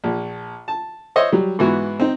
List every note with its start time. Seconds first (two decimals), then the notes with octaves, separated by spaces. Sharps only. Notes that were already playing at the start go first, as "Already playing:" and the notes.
0.04 A#1
0.68 A5
1.16 C5 C#5 D#5 E5
1.32 F#3 G3
1.59 G#2 E3 B3 F#4
2.00 C4 D#4